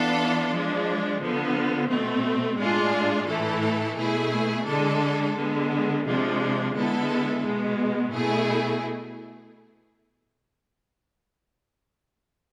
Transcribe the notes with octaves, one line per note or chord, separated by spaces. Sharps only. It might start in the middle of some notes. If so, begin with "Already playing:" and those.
Already playing: E3 B3 D4 F4 A4
F3 G#3 D4
D3 F3 B3
B2 A3 C4
A2 G#3 D4 F4 G#4
A2 E3 A3 E4 A4
B2 A3 E4 G#4
D3 G#3 D4 A4
D3 G#3 B3
C3 F3 G#3 D4
D3 G#3 B3 E4 A4
B2 G#3 B3
B2 A3 E4 G#4